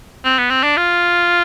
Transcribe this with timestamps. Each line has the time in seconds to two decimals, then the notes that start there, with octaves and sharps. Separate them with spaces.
0.25 C4
0.38 B3
0.50 C4
0.63 D4
0.77 F4